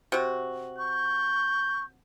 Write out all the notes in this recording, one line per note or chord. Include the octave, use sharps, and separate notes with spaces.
C3 F#4
C#6 G6